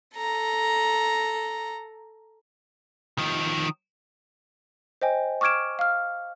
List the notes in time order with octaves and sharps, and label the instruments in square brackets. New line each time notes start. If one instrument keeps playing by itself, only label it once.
[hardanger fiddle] A4 A#5
[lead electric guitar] D#3 F3
[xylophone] C5 D#5 G5 G#5
C#6 D6 F6 G#6 D7 E7
F5 F6